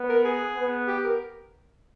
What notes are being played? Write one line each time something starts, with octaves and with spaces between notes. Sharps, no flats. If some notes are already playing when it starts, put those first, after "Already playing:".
Already playing: B3
A#4
G#4
B3
G4
A#4